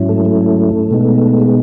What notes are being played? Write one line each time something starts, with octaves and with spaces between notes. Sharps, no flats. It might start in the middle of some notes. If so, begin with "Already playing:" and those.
Already playing: G#2 F#3 C#4 E4
A3 A4
A3 A4
B2 G#3 B3 D#4
G#4